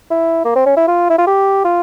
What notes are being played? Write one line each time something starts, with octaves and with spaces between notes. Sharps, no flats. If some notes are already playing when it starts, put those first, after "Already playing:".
E4
A#3
C4
C#4
E4
F4
E4
F4
G4
F4